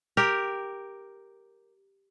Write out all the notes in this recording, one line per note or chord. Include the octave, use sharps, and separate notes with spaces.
G4 A#4